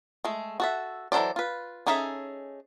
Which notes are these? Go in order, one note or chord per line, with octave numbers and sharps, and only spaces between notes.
G#3 A3
F#4 A4 E5
E3 F#3 A4 C5 D5
F4 B4
C#4 D#4 G#4 A4 E5